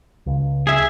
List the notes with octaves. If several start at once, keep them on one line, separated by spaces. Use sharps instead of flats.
C#2
G#4 E5